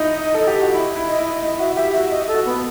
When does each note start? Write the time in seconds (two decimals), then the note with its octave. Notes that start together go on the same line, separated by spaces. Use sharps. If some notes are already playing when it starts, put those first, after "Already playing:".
Already playing: D#4 E4 D#5
0.34 A4
0.47 G4
0.61 F#4
0.73 E4 D#5
0.96 E4
1.08 D#5
1.19 E4
1.42 E4 D#5
1.59 F#4 E5
1.76 G4 E5
1.93 F#4 E5
2.11 D#5
2.28 A4
2.34 F#4
2.46 B3